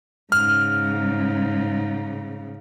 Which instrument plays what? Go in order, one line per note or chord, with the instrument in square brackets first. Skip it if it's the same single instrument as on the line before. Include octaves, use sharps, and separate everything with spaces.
[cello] G#2 C#3 [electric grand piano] F6